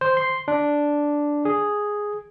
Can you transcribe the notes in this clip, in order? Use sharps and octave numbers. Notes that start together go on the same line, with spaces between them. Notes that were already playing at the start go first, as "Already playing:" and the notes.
C5
C6
D4
G#4